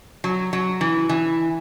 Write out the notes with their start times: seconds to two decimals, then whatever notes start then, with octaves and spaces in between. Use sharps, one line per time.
0.24 F#3
0.53 F#3
0.81 E3
1.09 E3